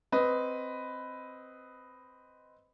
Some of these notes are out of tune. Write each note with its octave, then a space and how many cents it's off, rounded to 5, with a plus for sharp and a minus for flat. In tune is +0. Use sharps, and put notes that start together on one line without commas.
C4 +0 B4 +10 D#5 +0